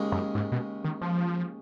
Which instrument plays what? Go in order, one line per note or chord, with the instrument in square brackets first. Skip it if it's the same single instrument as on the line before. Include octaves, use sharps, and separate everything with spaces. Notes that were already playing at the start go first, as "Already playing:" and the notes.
Already playing: [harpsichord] D#2 C#3 G#3
[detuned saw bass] F#2
G#2
B2
D#3
F3